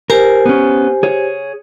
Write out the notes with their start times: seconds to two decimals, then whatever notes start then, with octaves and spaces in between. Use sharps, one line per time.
0.10 G4 A#4 C5 G#5
0.46 B3 C#4
1.03 G#4 C#5